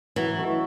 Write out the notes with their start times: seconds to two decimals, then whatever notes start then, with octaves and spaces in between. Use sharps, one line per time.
0.16 E3 F#3
0.38 A3 C#4 A4